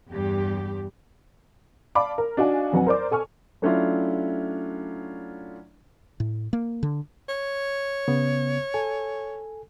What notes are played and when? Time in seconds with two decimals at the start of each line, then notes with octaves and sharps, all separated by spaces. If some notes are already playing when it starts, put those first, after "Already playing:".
0.10 E2 G2 G4
1.95 D5 F5 A5 B5 D6
2.18 A#4
2.37 D4 D#4 F#4 F5 G#5
2.72 F2 F#3 B4 F#5 G#5
2.87 A#4 C5 D5 D6
3.11 A4 G#5 C#6 F6
3.62 F#3 A3 C#4 D4 E4 F4
6.20 A2
6.53 A#3
6.83 D3
7.28 C#5
8.08 C#3 B3
8.74 A4 G#5